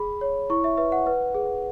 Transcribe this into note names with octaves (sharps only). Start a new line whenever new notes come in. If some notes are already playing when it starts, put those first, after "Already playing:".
Already playing: G#4 B5
C#5
E4 C#6
E5
B4 E5
F#5
B4
G#4